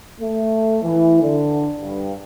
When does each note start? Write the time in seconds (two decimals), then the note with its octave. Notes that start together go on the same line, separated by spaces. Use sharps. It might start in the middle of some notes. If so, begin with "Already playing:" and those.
0.20 A3
0.83 E3
1.21 D3
1.80 G2